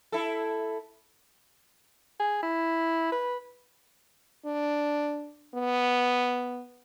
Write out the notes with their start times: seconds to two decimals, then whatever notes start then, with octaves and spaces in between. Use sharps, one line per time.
0.12 E4 A4
2.20 G#4
2.43 E4
3.12 B4
4.45 D4
5.55 B3